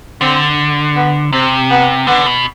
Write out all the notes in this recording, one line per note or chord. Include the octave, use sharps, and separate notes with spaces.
D3 C4
B3
C3 C4
B3
D3 B3
B2